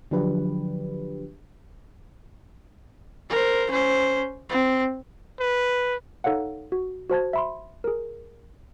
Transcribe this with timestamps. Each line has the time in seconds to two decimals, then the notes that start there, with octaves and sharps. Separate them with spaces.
0.11 D3 F3 F#3 D4 G4 B4
3.30 A#4 C5
3.71 C#4 C5
4.50 C4
5.40 B4
6.24 D#4 A4 C#5 F5 F#5
6.72 F#4
7.09 F#4 C5 A5 G#6
7.33 E5 B5 C6
7.84 G#4 A#4